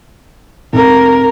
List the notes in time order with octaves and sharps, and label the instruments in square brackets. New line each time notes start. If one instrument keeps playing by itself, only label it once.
[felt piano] F1 [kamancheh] A#4